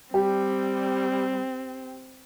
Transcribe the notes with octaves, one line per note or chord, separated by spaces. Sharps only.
G3 C4 G4